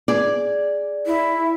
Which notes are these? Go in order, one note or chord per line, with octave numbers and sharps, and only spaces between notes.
G#4 D5
E4